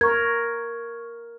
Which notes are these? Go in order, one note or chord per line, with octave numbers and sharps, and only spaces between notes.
A#4 C#6 G#6